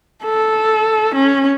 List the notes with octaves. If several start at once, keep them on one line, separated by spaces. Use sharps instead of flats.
A4
C#4